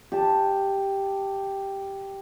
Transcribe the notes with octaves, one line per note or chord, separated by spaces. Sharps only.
G4 A5